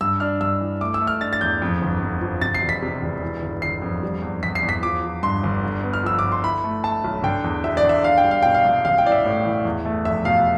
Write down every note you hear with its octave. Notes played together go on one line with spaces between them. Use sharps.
G2 E6
D4 F6
G2 E6
E3
A3 D6
E6
A3
F6
D4 A6
A6
E2 G6
F2
G1
F2
F3
C3 A6
C7
E1
B6
C3
E1
E3
G1
G1 C7
F2
G3
E2
E2 B6
C7
E2
B6
F3 D6
F3
G2 C6
G1
D3
B3
F6
F3 E6
D6
D3
C6
E4 B5
A3
A3 A5
B1
D3 G5
E2
E1 E5
D5
D3
E5
D4 F5
G5
G3
F5
B2 G5
F5
C2
A1 F5
G5
E3 D5
E5
A2
E3
E2
A3
F1 E5
B2 F5